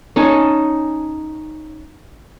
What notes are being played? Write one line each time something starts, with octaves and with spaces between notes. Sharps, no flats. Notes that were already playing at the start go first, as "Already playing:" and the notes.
C#4 D#4 C#5 A5